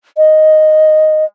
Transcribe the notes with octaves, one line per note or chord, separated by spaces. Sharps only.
D#5